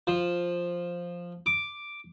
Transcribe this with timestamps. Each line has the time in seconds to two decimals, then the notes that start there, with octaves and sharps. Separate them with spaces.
0.07 F3
1.46 D6